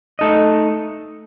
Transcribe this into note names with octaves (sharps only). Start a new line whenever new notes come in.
A3 D#4 A4 D#5